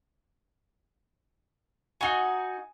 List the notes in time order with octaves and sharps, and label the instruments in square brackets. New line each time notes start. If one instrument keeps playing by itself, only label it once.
[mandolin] D#4 F#4 [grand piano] G#5